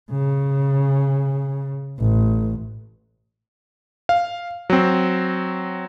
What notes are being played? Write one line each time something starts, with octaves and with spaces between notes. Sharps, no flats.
C#3
A1
F5
F#3 C4